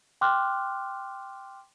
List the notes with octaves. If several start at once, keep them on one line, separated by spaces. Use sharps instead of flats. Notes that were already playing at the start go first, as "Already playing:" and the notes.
G5 C6 D6 F6 F#6